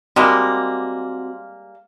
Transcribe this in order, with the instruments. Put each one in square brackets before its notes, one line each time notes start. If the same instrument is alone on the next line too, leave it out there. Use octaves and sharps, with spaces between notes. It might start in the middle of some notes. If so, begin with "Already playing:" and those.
[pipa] G3 G#3 A#3 [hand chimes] C4 F#4 C6